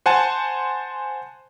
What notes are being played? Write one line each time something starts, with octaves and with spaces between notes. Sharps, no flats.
C5 F#5 G#5 A5